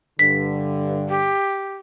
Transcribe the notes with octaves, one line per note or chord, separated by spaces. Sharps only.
G2 D3 B6
G4